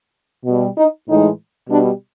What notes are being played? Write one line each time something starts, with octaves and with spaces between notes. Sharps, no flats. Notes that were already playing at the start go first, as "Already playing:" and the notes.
B2 G3
D#4
A2 E3 G#3 D#4
B2 G3 D4